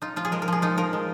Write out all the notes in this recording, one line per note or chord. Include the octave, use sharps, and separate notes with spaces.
D#4 F4
F3 F4
G#4
G#3 A#4
A#4
F3 G#4
D#4 F4
F3 A#4
G#3